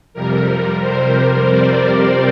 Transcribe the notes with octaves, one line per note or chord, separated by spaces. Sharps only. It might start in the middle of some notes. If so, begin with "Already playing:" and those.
F2 C3 G3 A#4
C5
D5